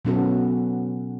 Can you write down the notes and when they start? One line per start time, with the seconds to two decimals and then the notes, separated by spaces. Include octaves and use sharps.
0.05 B2 F#3 B3 C#4 F#4 A4